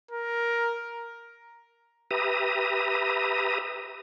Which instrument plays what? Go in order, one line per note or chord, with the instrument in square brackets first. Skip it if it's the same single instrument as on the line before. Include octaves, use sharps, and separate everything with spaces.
[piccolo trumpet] A#4
[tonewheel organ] G4 B4 E5 A#5 D#6